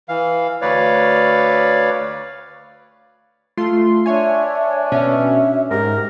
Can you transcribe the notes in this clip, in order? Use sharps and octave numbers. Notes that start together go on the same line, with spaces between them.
E3 F5
D2 B4 C#5 D5 F5
A3 F4 C6
D4 C#5 E5 G#5
B2 C#4 E5
G#2 G4 A#4